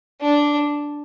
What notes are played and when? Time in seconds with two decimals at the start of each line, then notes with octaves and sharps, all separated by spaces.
0.22 D4